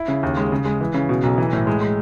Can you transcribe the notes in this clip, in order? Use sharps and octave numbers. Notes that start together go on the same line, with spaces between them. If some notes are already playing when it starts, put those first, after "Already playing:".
Already playing: E4
C#3
D#2
G#3
C#3
G#3
E3
C#3
B2
B1
E3
A2
G#3
G#3